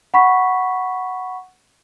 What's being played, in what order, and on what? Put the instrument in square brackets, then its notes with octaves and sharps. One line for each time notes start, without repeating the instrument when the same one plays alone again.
[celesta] F#5 B5 C#6 B6